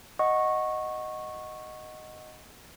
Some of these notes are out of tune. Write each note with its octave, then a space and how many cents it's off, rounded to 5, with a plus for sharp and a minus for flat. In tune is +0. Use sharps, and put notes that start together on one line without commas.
D#5 +0 F#5 +0 C#6 -10